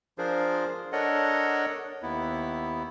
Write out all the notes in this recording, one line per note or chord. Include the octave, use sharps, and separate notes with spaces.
F3 D4 F4 G#4 A#4 C5
D4 A4 A#4 C#5 D#5 F#5
D#2 B3 E4